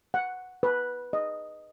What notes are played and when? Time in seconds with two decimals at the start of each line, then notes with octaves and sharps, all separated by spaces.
0.14 F#5
0.63 B4
1.13 D#5